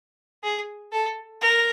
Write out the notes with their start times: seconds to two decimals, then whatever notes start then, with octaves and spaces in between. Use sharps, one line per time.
0.44 G#4
0.92 A4
1.41 A#4